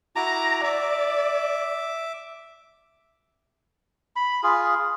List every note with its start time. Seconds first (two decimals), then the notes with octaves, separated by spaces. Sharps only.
0.16 E4 F#4 A#5 D6
0.64 D5 E5 D6
4.16 B5
4.43 F4 G#4